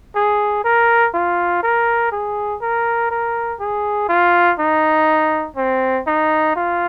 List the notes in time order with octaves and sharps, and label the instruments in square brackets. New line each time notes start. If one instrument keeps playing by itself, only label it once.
[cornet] G#4
A#4
F4
A#4
G#4
A#4
A#4
G#4
F4
D#4
C4
D#4
F4